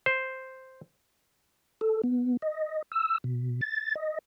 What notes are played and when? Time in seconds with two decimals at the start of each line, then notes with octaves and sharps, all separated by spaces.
0.06 C5
1.81 A4
2.04 B3
2.42 D#5
2.92 E6
3.24 B2
3.61 A6
3.95 D#5